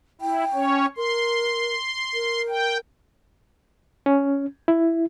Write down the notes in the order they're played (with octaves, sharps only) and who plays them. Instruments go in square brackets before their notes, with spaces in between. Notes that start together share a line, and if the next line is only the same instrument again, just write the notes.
[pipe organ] E4 [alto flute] G5
[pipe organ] C#4 C#5
[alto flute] A#4 [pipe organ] C6
[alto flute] A#4
[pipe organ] G5
[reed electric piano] C#4
E4